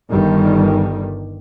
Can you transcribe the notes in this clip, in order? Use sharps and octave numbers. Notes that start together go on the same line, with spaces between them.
G1 D#3 G3